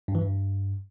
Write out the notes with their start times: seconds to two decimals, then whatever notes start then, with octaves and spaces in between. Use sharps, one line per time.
0.08 G2
0.15 E3
0.22 G2